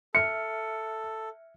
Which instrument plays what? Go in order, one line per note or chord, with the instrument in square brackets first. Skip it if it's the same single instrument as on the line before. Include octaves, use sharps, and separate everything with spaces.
[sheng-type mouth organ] A4 [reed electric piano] E5 F6 [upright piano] C#7